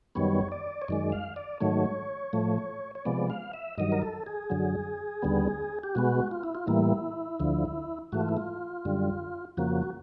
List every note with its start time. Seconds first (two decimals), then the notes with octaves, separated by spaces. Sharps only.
0.15 F#2 D#3 G3 B3 C#5
0.52 D5
0.82 C#5
0.88 F#2 D#3 G#3 D5
1.12 F5
1.36 D5
1.60 G#2 D#3 F#3 A3 C#5
2.33 A2 F3 A3
2.95 C#5
3.05 C3 F3 G#3 B3 D5
3.30 F5
3.53 E5
3.78 G2 D#3 F#3 D#5
3.92 A#4
4.02 A4
4.26 G#4
4.50 F#2 D3 F#3
5.22 D#2 D3 G3 B3
5.83 G4
5.95 B2 G#3 B3 F#4
6.31 F4
6.44 E4
6.55 F4
6.67 A2 E3 G3 A#3 E4
7.40 D2 D3 F3
8.12 G#2 E3 A3 F#4
8.21 F4
8.29 E4
8.37 F4
8.85 F#2 D3 G3
9.57 F2 C#3 F3 A#3 F#4